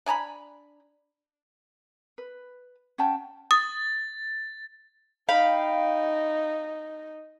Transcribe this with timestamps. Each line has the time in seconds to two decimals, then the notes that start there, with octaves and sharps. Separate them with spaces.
0.06 D4 G#5 A#5 B5
2.18 B4
2.98 C#4 F#5 G5 A5
3.51 D#6 A6
5.29 D#4 F5 G5 B5